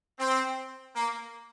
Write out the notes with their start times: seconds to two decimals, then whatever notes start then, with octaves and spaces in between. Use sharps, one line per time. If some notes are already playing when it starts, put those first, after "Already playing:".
0.19 C4
0.96 A#3